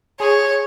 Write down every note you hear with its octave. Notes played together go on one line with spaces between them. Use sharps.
G#4 C#5